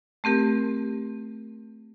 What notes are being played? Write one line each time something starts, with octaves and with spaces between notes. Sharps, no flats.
A3 C4 G4 A#4